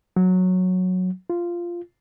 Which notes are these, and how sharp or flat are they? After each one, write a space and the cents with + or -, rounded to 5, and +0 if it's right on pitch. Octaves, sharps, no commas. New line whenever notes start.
F#3 -10
F4 -10